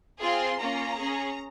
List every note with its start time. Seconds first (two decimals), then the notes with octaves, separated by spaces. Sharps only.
0.20 C4 F4 G#4 C6
0.58 A#3 C#4 F4 A#5
0.97 C#4 G#4